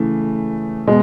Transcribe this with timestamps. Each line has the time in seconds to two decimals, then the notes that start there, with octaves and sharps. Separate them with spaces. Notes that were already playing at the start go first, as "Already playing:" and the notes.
Already playing: C#3 E3 A3
0.87 B2 G#3